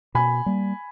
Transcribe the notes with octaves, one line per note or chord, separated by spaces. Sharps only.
B2 G#5 B5
G3 A#3